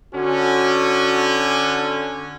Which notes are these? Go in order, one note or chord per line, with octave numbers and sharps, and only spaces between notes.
D3 C#4 F#4